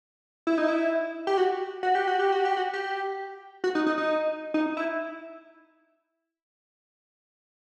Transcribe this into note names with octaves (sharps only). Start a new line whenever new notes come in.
E4
D#4
E4
G4
F#4
F#4
G4
F#4
G4
F#4
G4
F#4
G4
F#4
D#4
D#4
D#4
D#4
E4